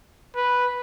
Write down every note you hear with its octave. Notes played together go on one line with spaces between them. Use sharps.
B4